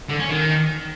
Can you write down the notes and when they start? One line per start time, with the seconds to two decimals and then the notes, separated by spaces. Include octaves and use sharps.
0.09 D3
0.19 C#4
0.30 D#3